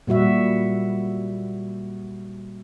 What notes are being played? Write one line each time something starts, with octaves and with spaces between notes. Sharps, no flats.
A#2 G3 F#4 E5